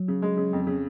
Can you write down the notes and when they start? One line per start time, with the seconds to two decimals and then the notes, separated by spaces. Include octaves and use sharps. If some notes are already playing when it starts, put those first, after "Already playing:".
Already playing: F#3
0.08 C#3
0.22 G#3
0.37 C#3
0.53 F2
0.67 C#3